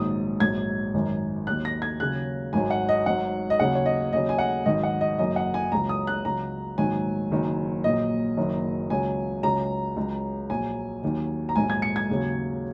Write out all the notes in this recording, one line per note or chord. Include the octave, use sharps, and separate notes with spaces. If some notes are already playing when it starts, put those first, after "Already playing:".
Already playing: A#1 G#2 D#3 F#3 D#6
A#1 G#2 F#3 G#6
G#1 F#2 D#3
D#2 D#3 F#3 F#6
A#6
G#6
D#2 C#3 F#3 F#6
G#1 G#2 F#3 G#5
F#5
D#5
G#1 G#2 F#3 F#5
D#5
D#2 C#3 F#3 F#5
C#5
D#5
D#2 C#3 F#3 D#5
G#5
F#5
G#1 G#2 D#3 F#3 D#5
F#5
D#5
F#1 F#2 F#3 D#5
F#5
G#5
C#2 C#3 F#3 A#5
D#6
F#6
C#2 C#3 F#3 A#5
A#1 G#2 D#3 F#3 G#5
F#1 F#2 D#3 F#3
A#1 A#2 F#3 D#5
F#1 F#2 D#3 F#3
C#2 C#3 F#3 G#5
C#2 C#3 F#3 A#5
C#2 C#3 F#3
A#1 A#2 F#3 G#5
D#2 D#3 F#3
A#5
A#1 G#2 F#3 G#5
G#6
C#7
G#6
D#2 C#3 F#3